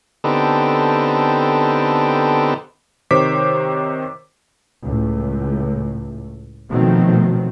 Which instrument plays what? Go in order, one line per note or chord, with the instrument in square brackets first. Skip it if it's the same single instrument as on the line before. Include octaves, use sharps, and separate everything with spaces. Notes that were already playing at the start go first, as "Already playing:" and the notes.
[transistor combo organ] D3 B3 C4 D#4 G4 A4
[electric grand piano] C3 D#3 C5 C#5 D6 B6
[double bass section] C#2 A2
B2 D#3 F3 F#3 A3 C4